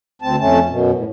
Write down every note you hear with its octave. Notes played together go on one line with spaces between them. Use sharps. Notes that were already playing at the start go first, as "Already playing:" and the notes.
D2 C4 A5
F2 A3 C#4 A5
F#2 B2
A2